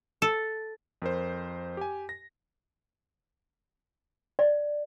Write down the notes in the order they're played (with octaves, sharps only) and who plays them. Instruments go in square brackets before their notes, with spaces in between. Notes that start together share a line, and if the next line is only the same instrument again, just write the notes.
[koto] A4
[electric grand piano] F2 A#4 C5
G4 G#5
A#6
[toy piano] D5